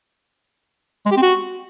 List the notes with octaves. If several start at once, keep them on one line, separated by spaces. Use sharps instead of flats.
G#3
G4
C4
F#4